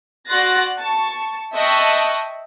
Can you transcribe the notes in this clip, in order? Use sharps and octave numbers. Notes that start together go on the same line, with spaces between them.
F#4 D5 C6 F#6 A6 A#6
A5 C#6
D#5 E5 G5 A5 C#6 F#6